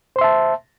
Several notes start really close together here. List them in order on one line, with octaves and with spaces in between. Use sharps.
C5 C6 E5 A5